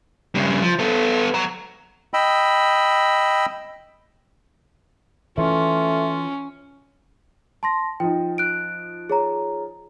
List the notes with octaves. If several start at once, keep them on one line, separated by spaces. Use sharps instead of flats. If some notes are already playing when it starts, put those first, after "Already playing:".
G2 C#3
F3
B3 A4
F#5 A#5
D#5 G5 B5 E6
E3 A3 C#4 F4
A5 C6 A#6
F3 D#4 G5
F#6 D7
G#4 C#5 A#5